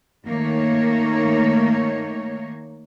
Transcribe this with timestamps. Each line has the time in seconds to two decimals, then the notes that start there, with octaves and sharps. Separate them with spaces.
0.27 D#3 A3 A#3 D#4 C#5